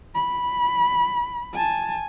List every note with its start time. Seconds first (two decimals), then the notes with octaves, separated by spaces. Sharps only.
0.15 B5
1.54 G#5 A5